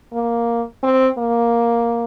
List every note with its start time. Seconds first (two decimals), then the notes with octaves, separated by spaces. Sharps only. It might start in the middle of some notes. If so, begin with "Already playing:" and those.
0.13 A#3
0.83 C4
1.18 A#3